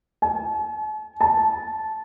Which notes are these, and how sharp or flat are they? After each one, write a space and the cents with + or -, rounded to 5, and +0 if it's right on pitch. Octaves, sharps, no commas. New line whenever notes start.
A5 -45
A5 -15